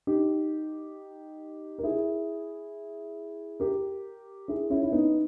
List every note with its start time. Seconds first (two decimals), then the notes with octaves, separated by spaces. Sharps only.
0.07 D#4 G4
1.79 A#4
1.83 E4 G#4
3.60 G4 A#4
4.48 E4 G#4
4.70 C#4 E4
4.83 E4
4.92 B3 D#4